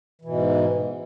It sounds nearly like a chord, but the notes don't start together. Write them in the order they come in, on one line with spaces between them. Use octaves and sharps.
E3 B2 G#2